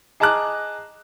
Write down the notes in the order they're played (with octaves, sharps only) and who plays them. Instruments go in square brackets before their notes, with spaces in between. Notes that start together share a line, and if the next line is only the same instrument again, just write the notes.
[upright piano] G#4 D#5 A5 A#5 D6 F#6